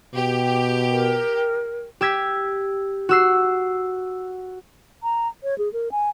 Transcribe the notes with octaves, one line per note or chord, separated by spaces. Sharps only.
B2 G4
A#4
G4 E6 G#6 B6
F#4 E6 C7
A#5
C#5
G#4
A#4
G#5